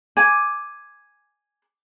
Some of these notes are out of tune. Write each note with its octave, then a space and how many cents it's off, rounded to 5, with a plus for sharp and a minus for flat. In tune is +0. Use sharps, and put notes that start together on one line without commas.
G#5 +0 D6 +0